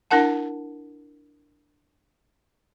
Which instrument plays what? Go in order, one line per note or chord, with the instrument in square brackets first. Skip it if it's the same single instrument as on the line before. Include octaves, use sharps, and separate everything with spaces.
[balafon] D4 E4 A#4 F#5 A5